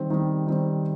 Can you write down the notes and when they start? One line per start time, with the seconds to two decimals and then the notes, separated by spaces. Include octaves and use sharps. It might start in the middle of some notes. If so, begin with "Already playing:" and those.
Already playing: D#3 G3 C4
0.10 D#3 G3 C4
0.47 D#3 G3 C4